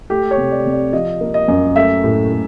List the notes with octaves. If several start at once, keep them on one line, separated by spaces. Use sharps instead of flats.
A3 G4
C#5
C3
D5
C3
D5
F3 D#5
A#3
D#5
F#2
A3 E5
A2
A2